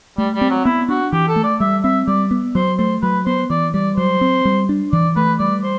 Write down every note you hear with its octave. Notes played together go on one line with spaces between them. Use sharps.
G3 A3
G3
C4
F#3
B3 E4
D4 F#4
E3 G4
A4
A3
D5
G3 E5
C4 E5
G3 D5
B3
F#3 C5
A3 C5
F#3 B4
B3 C5
E3 D5
G3 D5
F#3 C5
C4
G3
D4
E3 D5
A3 B4
G3 D5
C5